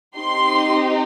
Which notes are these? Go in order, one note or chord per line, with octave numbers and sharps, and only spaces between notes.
C4 D#4 G4 C6